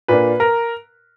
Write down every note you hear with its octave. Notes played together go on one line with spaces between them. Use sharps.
A#2 A#3 D4 B4
A#4